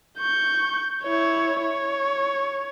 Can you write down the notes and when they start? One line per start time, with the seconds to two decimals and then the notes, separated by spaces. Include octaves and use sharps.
0.18 C#6 G6
1.03 E4 C#5
1.61 C#5